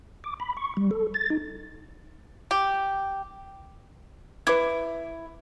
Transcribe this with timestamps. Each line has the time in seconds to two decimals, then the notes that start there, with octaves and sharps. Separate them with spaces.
0.24 D6
0.40 B5
0.57 C#6
0.77 G3
0.91 A4
1.14 A6
1.30 D#4
2.51 G4
4.47 E4 B4 D6 G#6